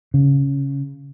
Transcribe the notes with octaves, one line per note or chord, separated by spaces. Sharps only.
C#3